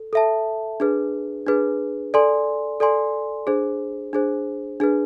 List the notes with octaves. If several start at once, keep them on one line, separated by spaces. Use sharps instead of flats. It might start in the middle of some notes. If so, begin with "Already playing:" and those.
Already playing: A4
A4 E5 A5
D4 G#4 B4
D4 G#4 B4
A4 D5 G#5 C6
A4 D5 G#5 C6
D4 G#4 C5
D4 G#4 C5
D4 G#4 B4